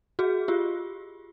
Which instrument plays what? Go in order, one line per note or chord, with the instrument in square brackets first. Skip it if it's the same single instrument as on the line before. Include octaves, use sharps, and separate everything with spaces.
[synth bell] F#4 G#4
F4 G4